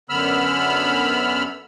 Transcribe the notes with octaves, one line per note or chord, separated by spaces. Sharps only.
F#2 D3 B3 B5 E6 F6